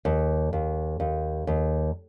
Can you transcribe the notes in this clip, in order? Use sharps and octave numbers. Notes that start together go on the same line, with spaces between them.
D#2
D#2
D#2
D#2